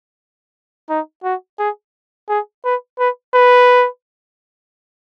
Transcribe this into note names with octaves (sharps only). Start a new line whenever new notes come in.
D#4
F#4
G#4
G#4
B4
B4
B4